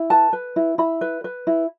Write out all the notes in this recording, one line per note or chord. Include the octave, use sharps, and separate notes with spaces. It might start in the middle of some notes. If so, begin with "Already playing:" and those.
Already playing: E4
B4 A5
B4
E4
E4 B5
B4
B4
E4